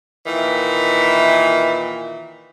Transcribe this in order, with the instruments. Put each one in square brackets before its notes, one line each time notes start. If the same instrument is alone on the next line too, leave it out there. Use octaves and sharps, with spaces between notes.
[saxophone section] A#2 D#3 E3